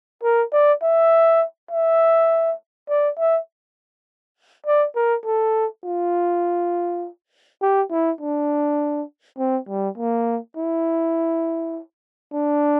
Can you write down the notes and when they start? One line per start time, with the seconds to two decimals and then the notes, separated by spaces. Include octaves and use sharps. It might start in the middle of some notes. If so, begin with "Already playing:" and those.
0.23 A#4
0.53 D5
0.83 E5
1.71 E5
2.89 D5
3.18 E5
4.66 D5
4.96 A#4
5.25 A4
5.85 F4
7.62 G4
7.91 E4
8.21 D4
9.38 C4
9.69 G3
9.98 A#3
10.57 E4
12.34 D4